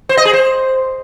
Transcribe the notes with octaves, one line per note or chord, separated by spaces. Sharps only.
C5
D#5
G#4
C5